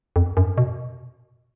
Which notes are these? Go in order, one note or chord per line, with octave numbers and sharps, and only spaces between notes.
F2
F#2
B2